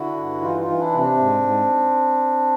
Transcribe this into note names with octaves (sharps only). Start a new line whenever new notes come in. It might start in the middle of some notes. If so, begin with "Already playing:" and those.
Already playing: D3 E4 F#4
G2
E3 D#4 F4
D#4 F4
E3
D4 E4
C3
C4 D4
G#2
G#2